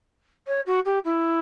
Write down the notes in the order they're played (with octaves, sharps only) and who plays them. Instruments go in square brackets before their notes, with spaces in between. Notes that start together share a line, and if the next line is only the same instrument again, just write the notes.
[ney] C#5
F#4
G4
E4